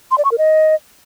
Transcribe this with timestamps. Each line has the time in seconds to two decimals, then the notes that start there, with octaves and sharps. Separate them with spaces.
0.11 C6
0.18 D5
0.25 C#6
0.31 A#4
0.38 D#5